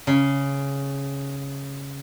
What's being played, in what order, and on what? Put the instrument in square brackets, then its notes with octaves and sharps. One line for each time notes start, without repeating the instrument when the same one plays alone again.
[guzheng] C#3